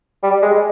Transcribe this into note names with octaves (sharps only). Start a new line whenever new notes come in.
G3
G#3